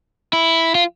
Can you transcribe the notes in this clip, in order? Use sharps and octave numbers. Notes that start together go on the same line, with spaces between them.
E4
F4